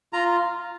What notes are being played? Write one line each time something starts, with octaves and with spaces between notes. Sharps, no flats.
F4 A#5